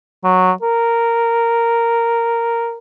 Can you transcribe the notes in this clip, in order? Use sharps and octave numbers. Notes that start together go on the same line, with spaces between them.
F#3
A#4